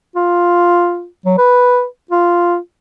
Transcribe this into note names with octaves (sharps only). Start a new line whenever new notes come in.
F4
F#3
B4
F4